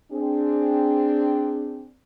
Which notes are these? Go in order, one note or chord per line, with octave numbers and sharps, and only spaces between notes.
C4 D4 G#4